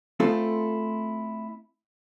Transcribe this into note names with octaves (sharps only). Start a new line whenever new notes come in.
A3 C4 E4 F4 G#4 A4